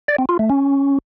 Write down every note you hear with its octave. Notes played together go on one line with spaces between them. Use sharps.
D5
C4
F4
A3
C#4